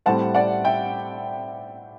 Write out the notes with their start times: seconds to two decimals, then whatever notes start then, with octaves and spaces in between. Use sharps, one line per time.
0.06 A2 G3 C4 F#5 A5
0.35 D5 F#5
0.64 E5 G5